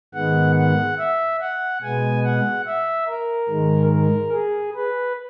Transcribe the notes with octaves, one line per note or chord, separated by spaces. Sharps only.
G#2 D#3 G#3 B3 F#5
F#5
E5
F#5
B2 G#3 B3 G#5
F#5
E5
A#4
G#2 D#3 G#3
A#4
G#4
B4